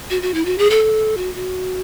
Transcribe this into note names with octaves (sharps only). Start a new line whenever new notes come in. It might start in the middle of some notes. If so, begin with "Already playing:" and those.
F#4
F#4
E4
F#4
G#4
A4
F#4
F#4